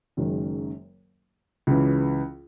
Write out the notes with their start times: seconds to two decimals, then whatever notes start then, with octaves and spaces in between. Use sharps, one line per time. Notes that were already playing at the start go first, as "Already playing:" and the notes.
0.17 F#1 F#2 D#3 G#3
1.67 C#2 C#3 E3